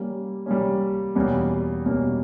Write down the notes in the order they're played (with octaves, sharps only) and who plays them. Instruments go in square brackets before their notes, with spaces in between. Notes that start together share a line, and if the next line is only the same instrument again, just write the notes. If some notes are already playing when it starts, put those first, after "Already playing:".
Already playing: [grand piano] G3 A#3 C#4
G3 A#3 C#4
E2 B2 G3 A#3 C#4
E2 B2 G3 A#3 C#4